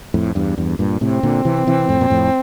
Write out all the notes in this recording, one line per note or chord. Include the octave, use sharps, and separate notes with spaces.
F2 A2
E2 G2
E2 G2
G2 A#2
A2 C3 C4
A#2 D3
C3 E3
C3 E3
F2 A2
A#2
F2 A2